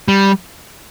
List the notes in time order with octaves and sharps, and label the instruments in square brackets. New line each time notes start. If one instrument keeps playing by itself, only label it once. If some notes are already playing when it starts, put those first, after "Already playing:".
[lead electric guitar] G3